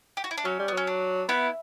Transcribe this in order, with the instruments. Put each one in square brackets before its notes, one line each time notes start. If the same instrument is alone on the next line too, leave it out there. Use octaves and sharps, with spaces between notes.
[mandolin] G4
F#4
E4
D4
[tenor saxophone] F#3 [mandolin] C#4
[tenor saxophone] G3
[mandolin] B3
[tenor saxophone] F#3 [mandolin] C#4
[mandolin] D4
[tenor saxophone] B3 [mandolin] E4